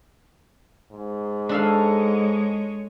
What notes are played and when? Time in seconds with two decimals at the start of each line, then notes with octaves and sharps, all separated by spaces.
0.92 G#2
1.49 G#3 D4 A4 C#5 F5